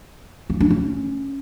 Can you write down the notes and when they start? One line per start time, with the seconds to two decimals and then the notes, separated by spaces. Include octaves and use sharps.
0.50 C#4
0.60 D4
0.70 C#4